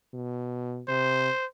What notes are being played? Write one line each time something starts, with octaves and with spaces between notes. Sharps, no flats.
B2
C3 C5